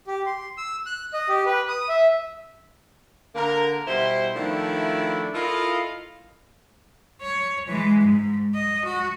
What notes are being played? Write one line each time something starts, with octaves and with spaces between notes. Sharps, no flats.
G4
C6
E6
F#6
D#5
G4
B4
D#6
E5
D3 A#3 A#4
B2 G3 E4 C5
D#3 F3 A3 D4 E4
E4 F4 A4 A#4 D#5 F5
C#5
E3 G#3
G#2
D#5
F#4